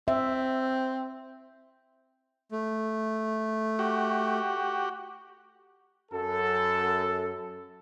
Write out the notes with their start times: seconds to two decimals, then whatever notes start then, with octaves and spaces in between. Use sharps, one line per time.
0.08 C4 E5
2.52 A3
3.79 F#4 G4
6.12 F#2 A4